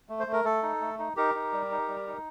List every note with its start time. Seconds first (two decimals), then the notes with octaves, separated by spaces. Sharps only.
0.09 A3
0.20 C5
0.27 A3
0.33 A#4
0.45 A3 A4
0.62 D#4
0.81 A3
0.99 D#4
1.16 D#4 G4 A#4
1.34 D#4
1.52 G3
1.71 D#4
1.88 G3
2.07 D#4